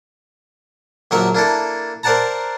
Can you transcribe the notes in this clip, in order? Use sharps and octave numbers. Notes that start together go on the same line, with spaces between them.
A#1 D3 F#3 A#4 E5 C#6
A#3 D4 E4 A4
A#4 C5 D5 F#5 A5 A#5